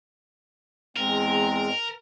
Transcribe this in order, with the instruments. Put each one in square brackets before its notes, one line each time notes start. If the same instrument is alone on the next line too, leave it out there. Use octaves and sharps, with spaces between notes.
[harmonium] E2 G#3 C4 [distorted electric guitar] A#4